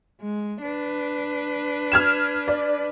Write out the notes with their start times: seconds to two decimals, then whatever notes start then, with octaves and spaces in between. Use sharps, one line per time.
0.21 G#3
0.62 D4 B4
1.92 F6 G#6 E7
2.48 D5